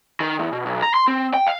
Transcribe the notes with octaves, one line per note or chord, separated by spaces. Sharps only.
D#3
E2
B2
B1
A#5
C6
C4
G5
F5